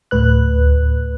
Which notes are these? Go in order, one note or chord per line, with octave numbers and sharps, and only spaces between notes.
D2 A2 B4 F#6